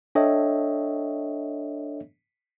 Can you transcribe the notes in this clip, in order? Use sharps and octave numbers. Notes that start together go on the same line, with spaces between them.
D4 A4 C#5 D#5 E5 G5